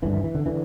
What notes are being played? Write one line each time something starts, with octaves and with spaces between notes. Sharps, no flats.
G2 D3 E3
E3
E3
D3
D3 E3